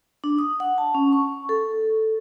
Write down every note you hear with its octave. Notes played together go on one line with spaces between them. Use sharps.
D4
D#6
F#5
A5
C#4
C#6
A4